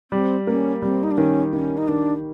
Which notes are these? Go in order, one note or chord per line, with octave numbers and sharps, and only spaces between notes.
G3 C4
A#3 C#4
G3 C4
D#4
D4
D#3 C#4
D#3 C#4
D#4
D#3 D4